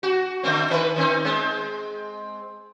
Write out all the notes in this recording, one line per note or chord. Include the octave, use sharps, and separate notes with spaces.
F#4
D3 A3 C4
D#3 B4
D#3 C4 D#4
G#3 C4